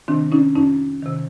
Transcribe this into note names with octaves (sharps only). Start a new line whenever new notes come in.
C3 D#3 C4 D4
C#4 D#4
F2 C#4 D#4
C3 D#3